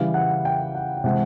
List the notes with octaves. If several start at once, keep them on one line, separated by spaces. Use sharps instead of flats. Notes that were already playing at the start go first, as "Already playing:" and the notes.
Already playing: C#3 E3 G3 F5
F#5
G5
F#5
G5
C3 E3 G#3 F#5